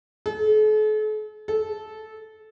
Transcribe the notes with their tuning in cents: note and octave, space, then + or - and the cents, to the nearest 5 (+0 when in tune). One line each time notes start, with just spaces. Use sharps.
A4 -45
A4 -15